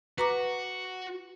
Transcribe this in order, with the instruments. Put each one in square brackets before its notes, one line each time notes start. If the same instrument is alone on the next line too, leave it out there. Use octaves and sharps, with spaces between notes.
[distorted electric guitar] F#4 [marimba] B4 A#5 D6